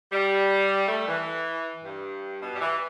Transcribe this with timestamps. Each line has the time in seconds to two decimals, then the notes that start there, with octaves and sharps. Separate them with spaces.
0.12 G3
0.88 A3
1.08 E3
1.84 G2
2.41 B2
2.54 G3
2.60 E3